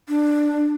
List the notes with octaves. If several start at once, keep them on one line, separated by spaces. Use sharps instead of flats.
D4